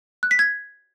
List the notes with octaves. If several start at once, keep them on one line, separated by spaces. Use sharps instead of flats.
F#6
B6
G#6